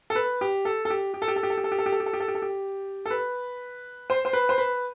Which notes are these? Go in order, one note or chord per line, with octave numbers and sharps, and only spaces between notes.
A4
B4
G4
A4
A4
G4
G4
A4
G4
A4
G4
A4
G4
A4
G4
A4
G4
A4
G4
A4
G4
A4
G4
A4
G4
A4
B4
C5
C5
B4
C5
B4